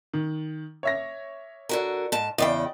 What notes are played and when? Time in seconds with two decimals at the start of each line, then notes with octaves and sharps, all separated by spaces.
0.13 D#3
0.83 C#5 E5 A#6
1.69 D3 F#4 A#4
2.12 G#2 A5
2.38 E2 C#3 D5 D#5 G5